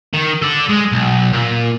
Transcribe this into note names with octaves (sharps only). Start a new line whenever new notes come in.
D#3
A4 D5
G#3
B1
A#2